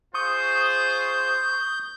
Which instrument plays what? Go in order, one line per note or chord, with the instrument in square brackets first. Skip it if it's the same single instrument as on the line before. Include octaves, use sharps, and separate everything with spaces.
[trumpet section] F4 G#4 C5 [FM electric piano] C#6 D#6 [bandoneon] G6